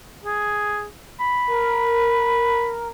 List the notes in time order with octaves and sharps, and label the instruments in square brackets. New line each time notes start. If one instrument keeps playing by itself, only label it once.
[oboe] G#4
B5
[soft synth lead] A#4